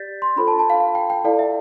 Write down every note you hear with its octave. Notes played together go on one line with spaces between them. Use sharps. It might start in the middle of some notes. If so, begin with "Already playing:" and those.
Already playing: G4 D5 G6 A6 B6
C6
D4 F4 A4 C5 B5
A5
A5
F5
F5
G5
G5
E4 A4 D5 F5
E5